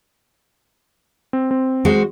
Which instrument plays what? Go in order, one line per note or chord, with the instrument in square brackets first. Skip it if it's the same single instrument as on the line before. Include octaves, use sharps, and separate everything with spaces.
[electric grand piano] C4
C4
[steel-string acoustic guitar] G#3 F#4 C5